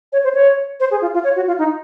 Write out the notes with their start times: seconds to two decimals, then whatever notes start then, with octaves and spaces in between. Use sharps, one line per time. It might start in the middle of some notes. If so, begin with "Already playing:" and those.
0.13 C#5
0.24 C5
0.34 C#5
0.80 C5
0.91 G#4
1.01 F4
1.14 F4
1.24 C#5
1.36 F#4
1.47 F4
1.58 D#4